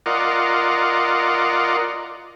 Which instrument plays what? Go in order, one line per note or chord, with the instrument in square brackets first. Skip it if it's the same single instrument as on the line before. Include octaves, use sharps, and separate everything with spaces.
[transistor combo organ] F4 A#4 D5 D#5 F#5